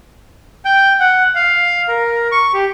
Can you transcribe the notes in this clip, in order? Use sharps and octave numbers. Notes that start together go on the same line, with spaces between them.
G5
F#5
F5
A#4
C#6
G4